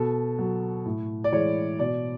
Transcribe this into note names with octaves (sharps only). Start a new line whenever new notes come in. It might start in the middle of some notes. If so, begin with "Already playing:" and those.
Already playing: B2 A4
F#3
A2
D5
E3 G#3 C#5
B2 D5